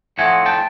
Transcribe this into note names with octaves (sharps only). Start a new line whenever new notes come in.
A2 F3 A3 C4 D#4 F#5 G#5
G5 A5